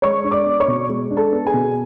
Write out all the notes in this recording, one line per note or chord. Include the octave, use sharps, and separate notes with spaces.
G#3 C#5 C#6
D4
D5 D6
B3
C#5 C#6
B2
G#3
D4
A4 A5
B3
G#4 G#5
B2